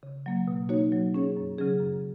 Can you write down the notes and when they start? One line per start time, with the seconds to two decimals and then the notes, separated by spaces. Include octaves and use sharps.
0.03 C#3
0.26 F#3 A#3
0.48 B2
0.69 A#3 D#4 F#4 C#5
0.92 F#3
1.14 C#4 G#4 C#5
1.37 F#2
1.58 C#3 F#3 C#4 G#4
1.80 F#2